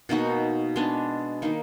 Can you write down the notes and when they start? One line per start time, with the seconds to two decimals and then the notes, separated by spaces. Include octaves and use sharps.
0.09 B2 A#3 D#4 F#4
0.76 G#3 B3 D4
1.42 D#3 A#3 D#4